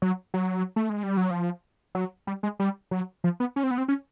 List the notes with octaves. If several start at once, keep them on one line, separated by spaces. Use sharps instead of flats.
F#3
F#3
A3
G#3
G3
F#3
F3
F#3
G3
G#3
G3
F#3
F3
B3
C#4
C4
B3
C4
C#4